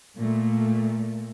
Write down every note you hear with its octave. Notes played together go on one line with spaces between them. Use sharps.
A#2 A3